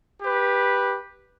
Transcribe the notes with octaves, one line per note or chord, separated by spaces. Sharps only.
G4 B4